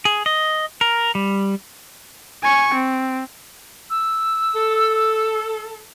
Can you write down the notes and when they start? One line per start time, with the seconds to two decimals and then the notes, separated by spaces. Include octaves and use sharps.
0.05 G#4
0.26 D#5
0.81 A#4
1.15 G3
2.43 G#5 C#6
2.75 C4
3.90 E6
4.55 A4